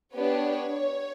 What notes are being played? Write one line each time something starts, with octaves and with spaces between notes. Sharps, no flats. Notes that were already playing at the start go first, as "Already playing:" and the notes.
B3 D4 G4 C#5